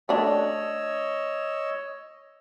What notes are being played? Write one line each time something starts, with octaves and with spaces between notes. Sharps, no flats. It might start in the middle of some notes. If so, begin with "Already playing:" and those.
A3 D4 C#5 D#5 E6